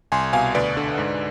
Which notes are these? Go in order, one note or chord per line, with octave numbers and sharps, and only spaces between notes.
C2 G#5 C6
B2 F5 G#5
D2 B4 D5
D3
G#2